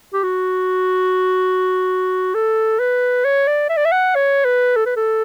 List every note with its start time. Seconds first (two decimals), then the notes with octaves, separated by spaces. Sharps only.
0.13 G4
0.23 F#4
2.34 A4
2.79 B4
3.24 C#5
3.47 D5
3.69 E5
3.77 D5
3.85 E5
3.92 F#5
4.15 C#5
4.45 B4
4.76 A4
4.85 B4
4.96 A4